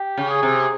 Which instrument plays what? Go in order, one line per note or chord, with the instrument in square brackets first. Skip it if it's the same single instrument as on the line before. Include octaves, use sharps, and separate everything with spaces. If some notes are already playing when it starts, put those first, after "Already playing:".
Already playing: [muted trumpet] G4
[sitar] C#3
[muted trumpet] G#4
[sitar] C3